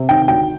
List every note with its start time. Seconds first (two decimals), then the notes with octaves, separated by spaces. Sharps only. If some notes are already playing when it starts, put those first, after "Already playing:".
Already playing: C3
0.09 D#3 G5
0.28 D2 G5